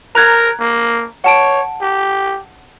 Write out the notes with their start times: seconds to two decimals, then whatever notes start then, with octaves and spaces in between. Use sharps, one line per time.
0.15 A#4 A#5 F#6 G#6
0.60 A#3
1.24 C#5 F#5 A5 D7
1.82 G4